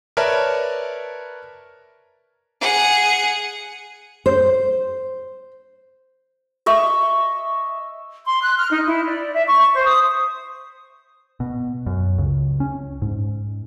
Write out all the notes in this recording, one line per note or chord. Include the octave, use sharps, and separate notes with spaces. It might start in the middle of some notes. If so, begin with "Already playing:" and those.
A#4 B4 C#5 D5 E5 A5
G#4 F#5
C5
D#5 E5 C#6
C6
F#6
F6
D#4
E4
D5
E5
C#6
C5
D#6
B2
F#2
C#2
C#4
G#2